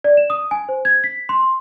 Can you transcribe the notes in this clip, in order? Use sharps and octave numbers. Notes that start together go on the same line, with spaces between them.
D5
E7
D#6
G#5
C5
G#6
B6
C6